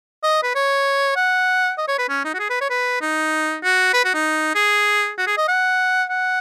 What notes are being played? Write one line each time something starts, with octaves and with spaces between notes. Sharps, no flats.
D#5
B4
C#5
F#5
D#5
C#5
B4
C#4
D#4
F#4
G#4
B4
C#5
B4
D#4
F#4
B4
F#4
D#4
G#4
F#4
G#4
D#5
F#5
F#5